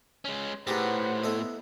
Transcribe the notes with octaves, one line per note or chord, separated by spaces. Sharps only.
G#3 C#4
A2 D#4 G4 G#4 B4 C5 F#5
B3 E4 A4 D#5